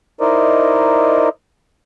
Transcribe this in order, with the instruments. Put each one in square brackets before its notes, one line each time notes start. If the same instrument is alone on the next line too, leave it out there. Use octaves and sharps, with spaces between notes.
[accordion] D#4 E4 A#4 C5 D5 D#5